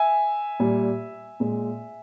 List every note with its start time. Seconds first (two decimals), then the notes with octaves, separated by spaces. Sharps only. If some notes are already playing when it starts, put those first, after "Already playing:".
Already playing: E5 G#5
0.60 A#2 G3
1.40 A#2 G#3